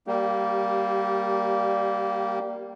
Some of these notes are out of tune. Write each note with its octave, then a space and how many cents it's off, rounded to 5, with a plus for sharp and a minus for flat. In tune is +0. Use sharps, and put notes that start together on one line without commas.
G3 +0 A#3 +0 G4 -25